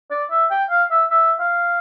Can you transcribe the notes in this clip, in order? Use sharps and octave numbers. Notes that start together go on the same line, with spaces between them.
D5
E5
G5
F5
E5
E5
F5